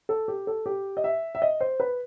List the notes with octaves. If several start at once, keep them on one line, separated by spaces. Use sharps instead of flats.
A4
G4
A4
G4
D#5
E5
E5
D#5
C5
B4